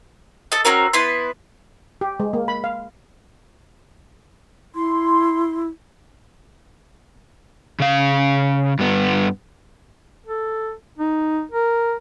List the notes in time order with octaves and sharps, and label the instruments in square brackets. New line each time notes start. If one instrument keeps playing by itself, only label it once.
[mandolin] A4 D#5
C4 C#4 F#4 A#4
B3 E4 B4 C6
[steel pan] G4
G#3
A#3
B5
F5
[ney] E4 [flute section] C6
[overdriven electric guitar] C#3 F5
G2 B3
[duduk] A4
D#4
A#4